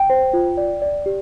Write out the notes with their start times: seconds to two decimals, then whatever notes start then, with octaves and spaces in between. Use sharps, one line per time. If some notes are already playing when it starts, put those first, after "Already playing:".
Already playing: G5
0.10 C5
0.33 F4
0.57 D5
0.82 D5
1.06 G4